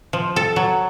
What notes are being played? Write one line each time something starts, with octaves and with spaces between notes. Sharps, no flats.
F3
A4
F#3